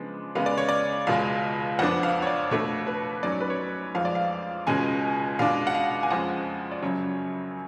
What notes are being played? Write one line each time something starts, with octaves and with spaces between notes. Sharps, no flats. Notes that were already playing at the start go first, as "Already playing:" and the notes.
Already playing: C#3 F3 G#3 B3 D4
C#3 G#3 B3 F5
D5
C#5
D5
C#2 B2 G#3 F5
F2 F3 B3 D4 F#5
F5
C#5
D5
B2 A3 D4 C#5
B4
G#2 F#3 C#4 D5
C#5
B4
C#5
F2 F3 G#3 F5
D5
F5
C#2 B2 G#3 C#4 G#5
B2 G#3 D4 F5
F#5
F5
G#5
F2 F3 G#3 C#4 F#5
D5
F#2 C#3 F#3 C#4 C#5